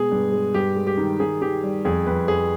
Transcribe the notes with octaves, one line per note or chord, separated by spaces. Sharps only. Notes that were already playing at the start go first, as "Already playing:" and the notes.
Already playing: B2 G#3 G#4
G2
G#3
G2 G4
G#3
G4
D#3
D#3 G#4
D#3 G4
G3
F2 G#4
F2 B4
F2 G#4